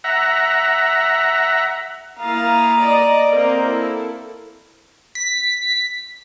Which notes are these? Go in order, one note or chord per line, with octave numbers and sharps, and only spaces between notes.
E5 F#5 A#5
A#3 E4 F5 A#5 D#6 A6
D5 D#5
A#3 C4 A#4
E4 A4
B6